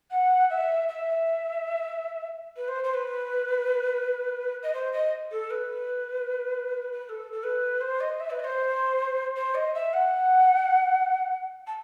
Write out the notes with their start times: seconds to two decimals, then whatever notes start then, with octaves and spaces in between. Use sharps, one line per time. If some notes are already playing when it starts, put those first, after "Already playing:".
0.10 F#5
0.50 E5
0.88 E5
2.56 B4
2.68 C5
2.83 C5
2.93 B4
4.62 D#5
4.73 C5
4.93 D#5
5.31 A4
5.50 B4
6.92 B4
7.04 B4
7.09 A4
7.32 A4
7.43 B4
7.81 C5
8.00 D#5
8.20 E5
8.30 B4
8.39 D#5
8.44 C5
9.35 C5
9.54 D#5
9.74 E5
9.93 F#5
11.66 A5